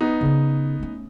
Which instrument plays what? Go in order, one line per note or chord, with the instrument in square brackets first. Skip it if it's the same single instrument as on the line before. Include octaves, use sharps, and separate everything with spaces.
[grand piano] B3 D#4
[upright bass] C#3 C#4
A3 C#4